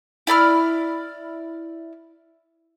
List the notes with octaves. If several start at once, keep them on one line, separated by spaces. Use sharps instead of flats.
E4 D5 B5 F6